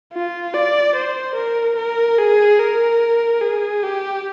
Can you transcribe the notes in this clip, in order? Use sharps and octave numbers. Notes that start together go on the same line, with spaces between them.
F4
D5
C5
A#4
A#4
G#4
A#4
G#4
G4